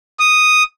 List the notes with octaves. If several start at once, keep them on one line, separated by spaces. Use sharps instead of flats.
D#6